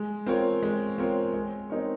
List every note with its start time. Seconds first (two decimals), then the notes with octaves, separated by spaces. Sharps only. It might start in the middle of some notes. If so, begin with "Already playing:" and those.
Already playing: G#3
0.26 C4 F4 A#4 C#5
0.62 G#3
0.98 C4 F4 A#4 C#5
1.33 G#3
1.70 C4 D#4 A#4 C#5